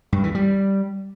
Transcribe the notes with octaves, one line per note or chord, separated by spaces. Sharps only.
G2
E3
G3